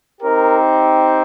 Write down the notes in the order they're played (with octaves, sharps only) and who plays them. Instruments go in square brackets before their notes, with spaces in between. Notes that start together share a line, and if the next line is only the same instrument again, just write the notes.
[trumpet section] C4 D#4 G4 A#4